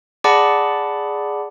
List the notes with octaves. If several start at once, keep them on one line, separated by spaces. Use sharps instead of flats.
G#4 D5 F#5 A5 B5 D6